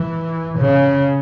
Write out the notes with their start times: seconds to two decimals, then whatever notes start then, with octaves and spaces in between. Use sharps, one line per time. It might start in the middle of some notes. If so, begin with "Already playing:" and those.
Already playing: E3
0.58 C#3